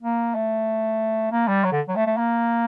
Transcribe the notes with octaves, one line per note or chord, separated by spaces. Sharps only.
A#3
A3
A#3
G3
F#3
D3
F#3
A3
A3
A#3